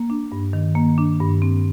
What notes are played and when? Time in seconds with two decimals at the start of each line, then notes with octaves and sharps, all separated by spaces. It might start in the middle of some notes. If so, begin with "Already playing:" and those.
Already playing: A#3
0.10 D4
0.32 G2
0.53 D#3
0.75 A#3
0.98 D4
1.20 G2
1.42 C4